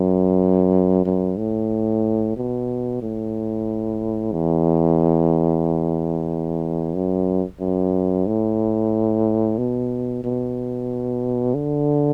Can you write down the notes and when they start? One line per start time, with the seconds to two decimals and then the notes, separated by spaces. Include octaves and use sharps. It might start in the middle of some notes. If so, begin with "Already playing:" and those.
Already playing: F#2
1.05 F#2
1.38 A2
2.36 B2
3.02 A2
4.32 E2
6.95 F#2
7.60 F#2
8.27 A2
9.58 B2
10.24 B2
11.55 D3